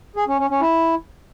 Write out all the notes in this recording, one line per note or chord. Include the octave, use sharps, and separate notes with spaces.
G#4
C#4
C#4
C#4
E4